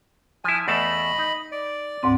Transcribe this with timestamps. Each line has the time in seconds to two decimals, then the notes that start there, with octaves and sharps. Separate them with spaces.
0.44 F3 E4 G#5
0.68 E2 A3 D#5 A5 B5
1.18 D#4
1.52 D5
2.03 D2 G#2 C4